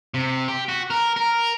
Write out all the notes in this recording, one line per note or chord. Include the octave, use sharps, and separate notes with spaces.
C3
G4
F#4
A#4
A#4